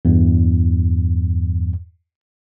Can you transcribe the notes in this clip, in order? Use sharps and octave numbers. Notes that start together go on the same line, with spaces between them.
E2 G2